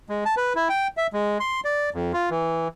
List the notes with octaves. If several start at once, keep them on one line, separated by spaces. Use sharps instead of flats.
G#3
A5
B4
E4
G5
E5
G#3
C6
D5
F2
F4
E3